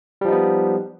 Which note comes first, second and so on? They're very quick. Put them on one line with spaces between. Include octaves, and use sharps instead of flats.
G3 F3 D#4 B3